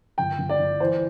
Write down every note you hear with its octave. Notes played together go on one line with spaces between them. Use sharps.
G1 G5
G1
D5
G1
E3 C5